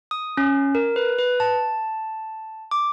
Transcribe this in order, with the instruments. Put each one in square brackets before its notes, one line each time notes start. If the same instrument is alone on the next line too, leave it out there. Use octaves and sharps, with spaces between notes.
[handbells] D#6
C#4
A#4
B4
B4
A5
D6